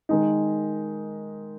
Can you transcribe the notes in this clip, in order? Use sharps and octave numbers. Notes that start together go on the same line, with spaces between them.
D#3 G#3 D#4